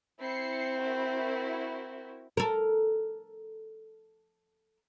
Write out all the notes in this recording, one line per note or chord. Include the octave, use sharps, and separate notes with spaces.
C4 E4 C7 C#7
E4 F#4 A#4
A4 A#4